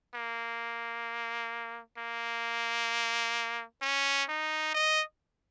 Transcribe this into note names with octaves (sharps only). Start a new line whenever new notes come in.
A#3
A#3
C#4
D#4
D#5